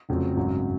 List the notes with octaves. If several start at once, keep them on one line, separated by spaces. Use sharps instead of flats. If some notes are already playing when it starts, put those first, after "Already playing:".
F1 F2 C#3 F#3 C4
G#1 F#2 C#3 F#3